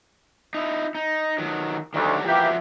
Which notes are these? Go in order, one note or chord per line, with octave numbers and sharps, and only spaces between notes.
D#4 E4
D#4
D#3 F#3
D2 D#3 F#3 G3
E3 F3 A#3 F#4 G4 E5